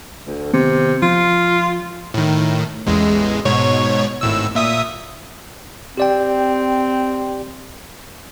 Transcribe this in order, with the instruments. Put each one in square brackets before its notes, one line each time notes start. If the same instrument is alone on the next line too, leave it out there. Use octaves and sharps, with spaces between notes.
[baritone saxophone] D2
[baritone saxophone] C3 [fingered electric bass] D#3 B3 C4
[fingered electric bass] F3 [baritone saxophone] F4
[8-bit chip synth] A2 D#3
A1 E2 G#3
G#2 B2 C#5
G#1 A2 E6
A#2 E5 D#6
[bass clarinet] C4 [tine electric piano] G4 D5 G5